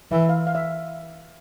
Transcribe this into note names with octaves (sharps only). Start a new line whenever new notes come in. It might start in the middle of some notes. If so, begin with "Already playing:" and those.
E3 E5
F5
F5
E5